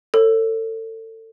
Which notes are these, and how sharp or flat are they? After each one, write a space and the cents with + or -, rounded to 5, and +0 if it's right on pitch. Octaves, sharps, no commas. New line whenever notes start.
A4 +30 C#5 -20